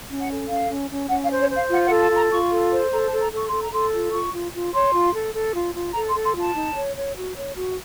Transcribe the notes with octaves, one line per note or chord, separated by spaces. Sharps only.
C#4
F#5
A4
C#4 F5
C#4
C#4
C#4 F#5
F5
C5
C#5
C5 F5
F4 F#5
F#5
A4
A5
F4 A#5
F4 C#6
A4
C5
A4 A#5
A5
A4
A#5
A4 C#6
A4 C6
A#5
A4 C6
F4
F4 C#6
F4
F4
C#5 C6
F4
A4
A4
F4
F4
A4 A#5
C6
A4
C6
F4 A5
D#4
C#5
C#5
F#4
C#5
F#4